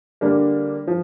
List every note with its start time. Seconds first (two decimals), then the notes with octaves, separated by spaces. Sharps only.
0.21 D3 G3 A#3 D4
0.87 F3